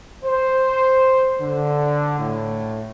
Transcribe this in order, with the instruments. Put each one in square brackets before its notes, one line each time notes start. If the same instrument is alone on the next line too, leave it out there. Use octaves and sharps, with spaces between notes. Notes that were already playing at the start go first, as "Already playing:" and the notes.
[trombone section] C5
D3
A2